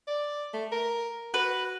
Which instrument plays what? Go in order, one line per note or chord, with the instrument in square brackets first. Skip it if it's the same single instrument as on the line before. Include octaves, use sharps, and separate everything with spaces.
[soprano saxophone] D5
A3
A#4
[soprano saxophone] F#4 [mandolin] B4